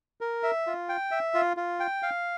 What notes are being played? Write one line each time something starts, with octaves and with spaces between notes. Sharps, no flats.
A#4
E5
F4
G5
E5
F4
F4
G5
F5